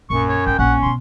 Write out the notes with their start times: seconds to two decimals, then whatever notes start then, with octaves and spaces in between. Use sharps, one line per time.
0.10 A#1 F#2 C#6
0.29 C#5
0.46 G#1 G5
0.59 A#1 C#4 D4 F#5
0.82 B2 B3 C6